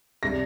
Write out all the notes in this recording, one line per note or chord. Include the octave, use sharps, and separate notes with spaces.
C3 G3 D4 A#6